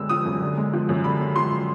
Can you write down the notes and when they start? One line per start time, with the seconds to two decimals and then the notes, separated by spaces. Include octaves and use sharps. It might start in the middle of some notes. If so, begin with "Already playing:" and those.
Already playing: F#2 D3 G#3 E6
0.09 F3 D#6
0.26 F#2
0.42 D3
0.57 G#3
0.74 F3
0.89 F#2
1.04 D3 B5
1.20 G#3
1.35 F3 C6